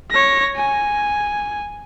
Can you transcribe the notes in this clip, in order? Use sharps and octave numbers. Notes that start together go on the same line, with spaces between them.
C#5 A#6
G#5